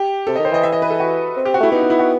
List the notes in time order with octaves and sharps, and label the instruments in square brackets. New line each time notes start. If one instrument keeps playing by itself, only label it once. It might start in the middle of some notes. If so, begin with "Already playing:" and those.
Already playing: [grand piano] G4
[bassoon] C3 [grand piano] A4
[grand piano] D#5
[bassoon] D#3
[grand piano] C5
[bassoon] E3 [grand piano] D#5
[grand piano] E5
D#5
B4
A4
F#4
[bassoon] C4
[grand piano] G4
F#4
[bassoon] A3 [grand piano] E4
[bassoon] B3 [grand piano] D#4
[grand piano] D#4
E4
F#4